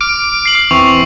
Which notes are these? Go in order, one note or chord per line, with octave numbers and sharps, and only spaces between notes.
D6 F6 D7
C7 F#7
E2 E3 C4 C#6 F7